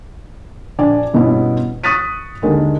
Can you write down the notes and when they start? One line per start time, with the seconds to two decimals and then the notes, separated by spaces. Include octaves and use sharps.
0.79 A#1 D4 D5 G#5
1.14 G2 B2 B3 C#4 E4
1.83 C#6 D#6 F#6 A6 B6 D#7
2.42 D#2 D3 D#3 G#3